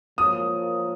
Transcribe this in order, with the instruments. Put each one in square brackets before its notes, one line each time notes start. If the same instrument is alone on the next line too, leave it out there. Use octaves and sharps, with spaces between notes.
[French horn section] F3 A#3 F4 A#4 C#5 [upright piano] D#6